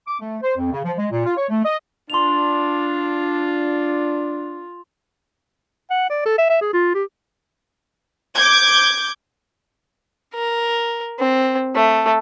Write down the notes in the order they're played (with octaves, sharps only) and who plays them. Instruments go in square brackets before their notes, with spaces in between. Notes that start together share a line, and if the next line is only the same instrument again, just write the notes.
[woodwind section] D6
A3
C5
F2
C#3
F3
G#3
A#2
F4
C#5
A3
D#5
[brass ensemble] D4 [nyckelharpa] F4 [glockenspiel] C6 F7
[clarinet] F#5
D5
A4
E5
E5
G#4
F4
G4
[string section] D6 G6 G#6
[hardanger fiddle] A#4
C4
A3